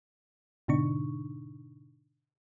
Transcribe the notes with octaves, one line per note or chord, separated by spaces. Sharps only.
G#2 B2 D3 D4 D#4 C#6